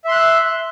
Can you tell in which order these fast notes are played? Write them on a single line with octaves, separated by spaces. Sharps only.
E5 C6 F#6